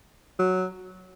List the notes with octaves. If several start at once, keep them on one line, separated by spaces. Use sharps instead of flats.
F#3